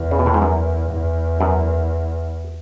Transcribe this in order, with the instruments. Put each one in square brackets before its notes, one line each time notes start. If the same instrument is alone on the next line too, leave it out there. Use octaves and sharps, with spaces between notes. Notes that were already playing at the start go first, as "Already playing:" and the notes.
Already playing: [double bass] E2
[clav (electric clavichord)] C#3
B2
A2
G#2
F#2
[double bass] E2
[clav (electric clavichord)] F#2